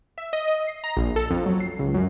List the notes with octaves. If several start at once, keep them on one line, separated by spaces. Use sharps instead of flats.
E5
D#5
D#5
C7
A#5
A#1
A4
F2
F#3
C7
C#2
F#2